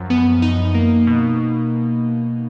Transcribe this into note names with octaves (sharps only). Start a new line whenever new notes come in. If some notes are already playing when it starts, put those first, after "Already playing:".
Already playing: F#2 F3
B3
D#4
A#3
B2